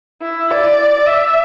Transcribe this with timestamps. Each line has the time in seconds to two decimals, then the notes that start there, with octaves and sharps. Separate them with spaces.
0.22 E4
0.50 D5
1.07 E5